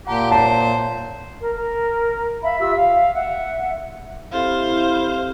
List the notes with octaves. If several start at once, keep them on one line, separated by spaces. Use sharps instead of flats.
A#2 G4 F#5 A5 A#5
C5 C#5 E5 A5
A#4
A#4
E5 F5 B5
F4 G4 E5 E6
F5
E5 F#5
C4 E4 G4 A4 C5 F5